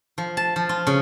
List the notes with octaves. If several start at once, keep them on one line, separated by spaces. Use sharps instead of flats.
F3
A5
F3
F4
C#3